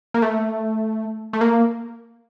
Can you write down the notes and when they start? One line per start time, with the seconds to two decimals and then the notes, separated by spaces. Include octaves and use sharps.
0.14 A#3
0.22 A3
1.33 A3
1.41 A#3